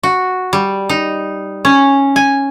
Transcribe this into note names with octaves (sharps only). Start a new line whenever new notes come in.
F#4
G3
D#4
C#4
G#5